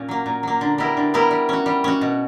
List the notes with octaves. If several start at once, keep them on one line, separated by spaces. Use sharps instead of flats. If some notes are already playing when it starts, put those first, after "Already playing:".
Already playing: A#2 C#4
F#3 A#3
A#2
F#3 A#3
D3
G3 B3 E4 A#4
D3
G3 B3 E4 A#4
G3
C#4 F#4
G3
C#4 F#4
B2